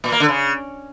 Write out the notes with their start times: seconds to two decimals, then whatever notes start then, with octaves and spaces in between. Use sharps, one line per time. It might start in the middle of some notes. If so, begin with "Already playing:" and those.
0.04 A#2
0.12 A#3
0.20 D3
0.28 C#3